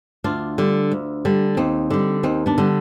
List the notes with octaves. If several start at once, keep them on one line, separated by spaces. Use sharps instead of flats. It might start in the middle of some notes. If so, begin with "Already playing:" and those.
D2 D4 F4
D3 G3
D2
D3 G3
D#2 C4 D#4
D3 G3
D#2 C4 D#4
B3 D4
D3 G3